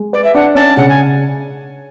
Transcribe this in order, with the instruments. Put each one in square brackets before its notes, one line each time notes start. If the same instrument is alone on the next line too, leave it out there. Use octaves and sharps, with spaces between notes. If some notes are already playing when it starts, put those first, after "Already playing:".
Already playing: [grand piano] G#3
[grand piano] B4 [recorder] D5
[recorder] E5
[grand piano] D4 [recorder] F#5
[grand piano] C#4 [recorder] A5
[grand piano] C#3 [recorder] F#5
[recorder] G#5